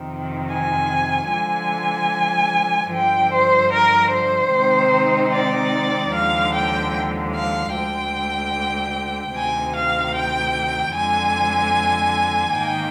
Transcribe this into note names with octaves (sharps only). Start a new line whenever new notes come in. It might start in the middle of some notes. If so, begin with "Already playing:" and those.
Already playing: F2 C3 D#3
G#5
D3 F3 G#3 G#5
G2 D3 F3 G5
C5
A#4
C5
C3 D#3 G#3 C4 D#4
D5
D#2 D3 F3 G#3 F5
G5
F5
D2 D3 G#3 G5
D2 C3 D#3 G#5
F5
G5
F2 D3 G#3 G#5
G#2 D#3 A#3 D#4 G5